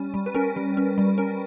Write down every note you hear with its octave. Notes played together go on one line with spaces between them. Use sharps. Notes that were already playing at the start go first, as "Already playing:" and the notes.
Already playing: G3 C#4
G3
B4
C#4 A#4
G3
C#4
G3
C#4 A#4